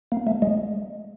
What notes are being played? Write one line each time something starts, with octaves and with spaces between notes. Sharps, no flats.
A#3
A3
G#3